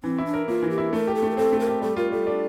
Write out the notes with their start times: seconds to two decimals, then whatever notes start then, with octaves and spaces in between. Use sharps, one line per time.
0.04 E3 C4
0.18 E4
0.26 D4
0.34 A#4
0.48 A#3 F4
0.63 E3
0.70 G4
0.78 E4
0.92 A3 A#4
1.07 G4
1.15 A4
1.23 A3
1.30 A#4
1.37 C4 A4
1.53 A3
1.60 A#4
1.67 G4
1.81 G3 A4
1.97 F4 A#4
2.12 G3 A4
2.27 D4